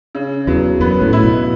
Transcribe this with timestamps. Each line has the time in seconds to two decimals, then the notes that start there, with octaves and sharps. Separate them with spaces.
0.15 C#3
0.47 E2 F#3
0.80 F#2 B3
1.01 A2
1.13 E4
1.24 B2